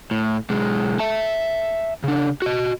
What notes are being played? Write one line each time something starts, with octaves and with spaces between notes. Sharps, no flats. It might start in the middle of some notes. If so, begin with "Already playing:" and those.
A2
B1 G#3
E5 A5
C#3 D4
F#4 D#5